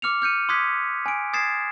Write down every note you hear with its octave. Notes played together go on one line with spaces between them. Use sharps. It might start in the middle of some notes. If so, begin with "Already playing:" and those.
D6 F6 C#7 F7
F6 G6 C#7 D#7
C6 D6 D#6 F#6 G#6 B6
G#5 D7
D#6 G#6 A6 C7 E7